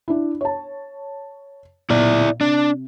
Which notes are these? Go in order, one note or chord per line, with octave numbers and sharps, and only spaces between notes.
D4 E4
C#5 A5
B1 A#2 E4 D5
C3 D4